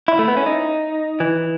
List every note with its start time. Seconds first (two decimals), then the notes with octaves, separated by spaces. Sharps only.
0.08 E4
0.19 A3
0.28 B3
0.37 C#4
0.46 D#4
1.20 E3